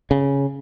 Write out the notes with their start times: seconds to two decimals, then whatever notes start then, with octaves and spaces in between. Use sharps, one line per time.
0.11 C#3